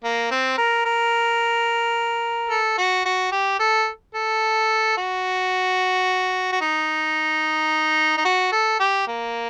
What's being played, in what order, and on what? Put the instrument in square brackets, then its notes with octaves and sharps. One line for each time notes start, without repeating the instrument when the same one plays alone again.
[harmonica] A#3
C4
A#4
A#4
A4
F#4
F#4
G4
A4
A4
F#4
F#4
D#4
D#4
F#4
A4
G4
A#3